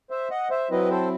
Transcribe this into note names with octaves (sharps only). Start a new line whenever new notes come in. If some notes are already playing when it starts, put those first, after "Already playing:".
C5 E5
D#5 F#5
C5 E5
F#3 C4 E4 B4 D#5
A4 C5